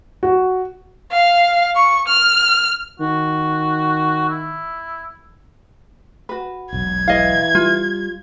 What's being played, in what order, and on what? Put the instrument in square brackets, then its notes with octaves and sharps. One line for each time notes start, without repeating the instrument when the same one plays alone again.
[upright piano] F#4
[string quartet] F5
C#6
F6
[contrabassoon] D#3 [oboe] F#4
[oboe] E4
[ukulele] F#4 B4
[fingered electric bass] E1 B1 [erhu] G#6
[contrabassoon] E3 [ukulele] D#5 F5
[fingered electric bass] G3 [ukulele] F4